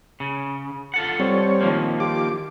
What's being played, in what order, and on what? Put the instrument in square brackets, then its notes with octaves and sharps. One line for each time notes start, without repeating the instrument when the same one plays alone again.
[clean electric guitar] C#3
F4 A4 F#5
[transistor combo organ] G3 C4 C#5
[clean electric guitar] D#3 F3 A#3
[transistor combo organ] F4 G4 D6